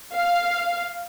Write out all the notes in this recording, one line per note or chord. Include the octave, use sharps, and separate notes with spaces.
F5